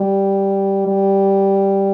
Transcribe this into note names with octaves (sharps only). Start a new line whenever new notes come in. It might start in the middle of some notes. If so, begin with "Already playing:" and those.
Already playing: G3
G3